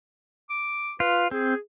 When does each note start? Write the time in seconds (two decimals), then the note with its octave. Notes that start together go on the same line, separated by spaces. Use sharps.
0.50 D6
1.00 F4 B4
1.31 C4 G#4